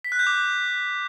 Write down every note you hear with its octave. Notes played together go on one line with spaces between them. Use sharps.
B6
F#6
G6
D6